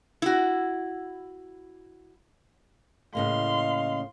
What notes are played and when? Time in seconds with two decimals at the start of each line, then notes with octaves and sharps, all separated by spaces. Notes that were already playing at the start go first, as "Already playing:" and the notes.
0.22 E4 F#4
3.15 A2 C#3 A#3 D#5 F5 C6